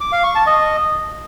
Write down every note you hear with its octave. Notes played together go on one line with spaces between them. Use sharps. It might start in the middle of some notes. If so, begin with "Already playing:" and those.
D6
F5
C#6
A5
D#5